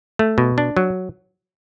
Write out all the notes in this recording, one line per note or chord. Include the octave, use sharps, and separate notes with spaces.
A3
B2
D4
F#3